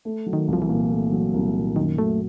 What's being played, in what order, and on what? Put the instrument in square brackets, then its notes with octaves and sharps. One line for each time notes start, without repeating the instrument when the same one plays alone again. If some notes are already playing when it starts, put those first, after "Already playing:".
[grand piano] A3
F#3
[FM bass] D#3
[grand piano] C2
[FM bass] F3
E3
[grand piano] A#2
A3
F#3
C2
A#2
[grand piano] F#2 [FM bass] D#3
[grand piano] F#3 [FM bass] A3